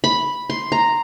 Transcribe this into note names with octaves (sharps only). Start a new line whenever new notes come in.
B5
C6
A#5